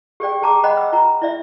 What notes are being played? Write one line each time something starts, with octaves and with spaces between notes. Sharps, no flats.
G4 G#4 D5 G5
G4 G#4 A5 A#5 D6
C5 D#5 F#5 G5 B5
E6
F4 A#5
E4 D5 E5